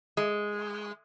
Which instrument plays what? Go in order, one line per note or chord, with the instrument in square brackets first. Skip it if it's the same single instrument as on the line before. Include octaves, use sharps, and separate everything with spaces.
[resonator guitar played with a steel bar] G#3